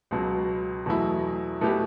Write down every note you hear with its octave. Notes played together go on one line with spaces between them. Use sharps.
C#2 B2 F#3
E2 B2 F#3 A3 E4
B2 A3 E4 G4 B4